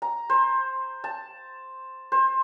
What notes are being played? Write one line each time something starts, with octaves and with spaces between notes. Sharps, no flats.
A#5
C5
A5
C5